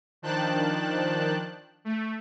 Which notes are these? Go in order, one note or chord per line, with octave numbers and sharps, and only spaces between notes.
D#3 F3 D4 G5 A5 F#6
A3